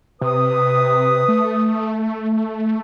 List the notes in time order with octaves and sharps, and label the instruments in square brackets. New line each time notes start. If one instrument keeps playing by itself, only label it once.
[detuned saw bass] C3 [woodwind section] B4 D#6
[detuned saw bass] A3